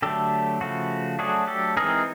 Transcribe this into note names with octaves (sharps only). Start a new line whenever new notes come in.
D3 F#3 A3 G4 A4
C#3 F3 A3 F#4
F#3 A3 D4 F#4 G#4
G4 A4
E3 G#3 C4 D#4 G#4 A#4